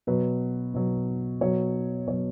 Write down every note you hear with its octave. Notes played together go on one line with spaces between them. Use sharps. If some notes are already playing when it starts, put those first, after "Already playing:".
B2 F#3 B4
B2 F#3
B2 F#3 C#5
B2 F#3 C#5